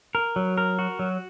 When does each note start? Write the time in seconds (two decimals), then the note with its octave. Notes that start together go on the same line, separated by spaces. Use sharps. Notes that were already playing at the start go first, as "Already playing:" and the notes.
0.15 A#4
0.36 F#3
0.57 A#4
0.79 F#4
0.99 F#3